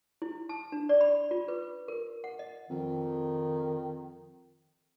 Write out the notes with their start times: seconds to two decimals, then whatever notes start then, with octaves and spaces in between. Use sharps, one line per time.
0.22 E4
0.49 A5
0.72 D4
0.89 D5
1.01 B5
1.31 F4
1.48 B4
1.88 A#4
2.24 F#5
2.39 D#5
2.70 F2 D#3